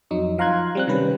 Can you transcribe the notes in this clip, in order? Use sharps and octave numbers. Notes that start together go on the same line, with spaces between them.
F2 F#3 D#4
F3 F5 A#5 C6 F#6 G#6
G3 C4 F#6
C3 D#3 G3 C#4 B4